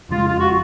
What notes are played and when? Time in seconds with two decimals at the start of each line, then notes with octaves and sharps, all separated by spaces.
0.09 F#1 F2 C#3 G#3 F4
0.28 F4
0.39 F#4